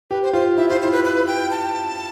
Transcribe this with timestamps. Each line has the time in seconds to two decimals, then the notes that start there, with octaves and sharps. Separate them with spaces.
0.11 G4 B4
0.22 C5
0.33 F4 C5
0.58 E4 E5
0.68 F4 C5
0.81 E4 C5
0.92 B4
1.04 B4
1.27 G5
1.51 A5